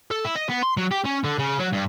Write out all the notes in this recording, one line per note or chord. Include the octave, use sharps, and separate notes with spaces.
A4
E4
D#5
B3
C6
F#3
G4
C#4
D3
C#3
F#3
G2